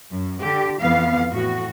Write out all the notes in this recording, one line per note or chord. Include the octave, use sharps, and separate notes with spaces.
F#2
D3 G4
F2 E3 B3 F5
A2 F#4